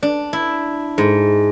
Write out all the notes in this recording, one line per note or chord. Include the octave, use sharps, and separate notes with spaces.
D4
E4
G#2